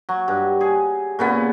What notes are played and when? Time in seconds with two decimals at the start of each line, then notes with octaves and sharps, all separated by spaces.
0.09 F#3
0.28 G2
0.61 G#4
1.19 A#2 C#3 B3